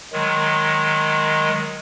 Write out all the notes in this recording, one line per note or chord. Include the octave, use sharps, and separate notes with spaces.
D#3 F#3 G#3